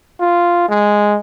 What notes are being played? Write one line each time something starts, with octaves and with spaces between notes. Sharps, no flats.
F4
G#3